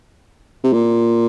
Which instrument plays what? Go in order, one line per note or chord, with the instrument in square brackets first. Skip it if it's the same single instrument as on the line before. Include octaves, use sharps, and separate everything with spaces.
[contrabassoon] C3
A#2